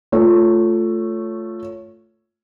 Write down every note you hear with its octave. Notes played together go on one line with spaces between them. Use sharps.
A3 F4 C#5